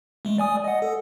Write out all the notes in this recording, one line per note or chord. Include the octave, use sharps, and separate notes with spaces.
G#3 A3
D5 G#5 D#6
D#5 F#5
A4